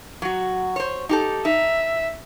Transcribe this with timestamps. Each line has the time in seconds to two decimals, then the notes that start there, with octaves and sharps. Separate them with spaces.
0.22 F#3 F#4
0.76 C5 C#5
1.09 D#4 G4 A4
1.45 D#4 E5